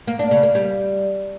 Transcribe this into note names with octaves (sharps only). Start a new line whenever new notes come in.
A#3
D4
C#3
A#3
G3